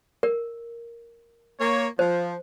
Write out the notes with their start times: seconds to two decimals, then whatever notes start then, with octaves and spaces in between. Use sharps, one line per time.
0.23 A#4
1.59 A#3 C#5
1.99 F3 C5